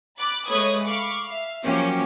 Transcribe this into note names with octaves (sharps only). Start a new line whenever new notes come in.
B5 D6 F#6 A6
G#3 A3 B4 C#5 D#6 G#6
F5 B5 C#6 D6
E5 F5
F3 F#3 A#3 C#4 G4 C#5